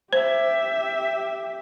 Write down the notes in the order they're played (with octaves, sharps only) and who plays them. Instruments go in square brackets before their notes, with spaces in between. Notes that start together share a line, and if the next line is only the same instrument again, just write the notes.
[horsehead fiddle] G4 E5 [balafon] C5